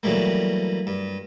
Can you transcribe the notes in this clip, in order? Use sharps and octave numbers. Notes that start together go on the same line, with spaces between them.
E3 F#3 G3 A3 A#3
G2